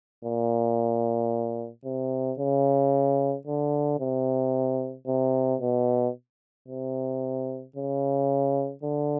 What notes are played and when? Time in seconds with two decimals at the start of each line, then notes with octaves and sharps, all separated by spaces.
0.25 A#2
1.85 C3
2.39 C#3
3.47 D3
4.00 C3
5.07 C3
5.61 B2
6.68 C3
7.76 C#3
8.83 D3